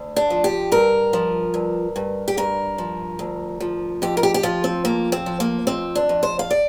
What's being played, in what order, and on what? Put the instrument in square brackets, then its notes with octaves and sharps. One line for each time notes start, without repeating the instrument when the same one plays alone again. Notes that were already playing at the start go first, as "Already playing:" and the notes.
Already playing: [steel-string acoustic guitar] D2
D4
F3
G4
G2 A#4
F3
G2
G2
G4
G2 A#4
F3
D2
F3
F2 G4
A#4
G4
G4
F3 F4
C4
F2 A#3
C4
F3
A#3
F2 C4
D4
F2
C5
F5
D5